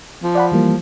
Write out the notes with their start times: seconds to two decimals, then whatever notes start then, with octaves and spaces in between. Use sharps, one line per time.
0.23 F3
0.35 D5 F#5 B5
0.52 E3 G3 A#3